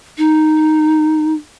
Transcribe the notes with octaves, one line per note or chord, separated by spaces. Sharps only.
D#4